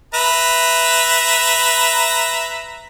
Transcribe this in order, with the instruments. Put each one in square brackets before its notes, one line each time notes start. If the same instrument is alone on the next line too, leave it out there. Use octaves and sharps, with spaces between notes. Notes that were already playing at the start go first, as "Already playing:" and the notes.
[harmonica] B4 E5 A#5